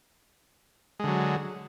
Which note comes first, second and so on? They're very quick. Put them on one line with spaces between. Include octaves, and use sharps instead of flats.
G#3 D3 F#3